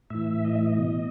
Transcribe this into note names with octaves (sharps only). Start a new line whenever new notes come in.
A2 E3 E5
D#5
E5
D#5
B2